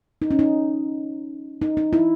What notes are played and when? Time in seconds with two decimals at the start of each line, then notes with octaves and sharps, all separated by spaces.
0.22 D#4
0.31 C#4
0.39 D#4
1.62 D#4
1.77 D#4
1.93 E4